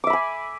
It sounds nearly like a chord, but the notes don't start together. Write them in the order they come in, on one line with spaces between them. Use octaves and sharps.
D6 E5 B5 G#5